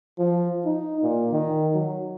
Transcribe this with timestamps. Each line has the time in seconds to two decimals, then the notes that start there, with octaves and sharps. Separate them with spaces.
0.19 F3
0.65 D#4
1.03 A#2
1.33 D#3
1.75 F#3